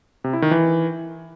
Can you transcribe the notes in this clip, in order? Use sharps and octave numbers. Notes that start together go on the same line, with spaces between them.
C3
E4
D#3
E3